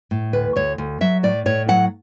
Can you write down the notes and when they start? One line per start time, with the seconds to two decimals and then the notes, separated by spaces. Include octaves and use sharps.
0.11 A2
0.33 D2 B4
0.56 D2 C#5
0.78 D2
1.01 F#3 E5
1.23 A2 D5
1.46 A2 C#5
1.68 F#3 F#5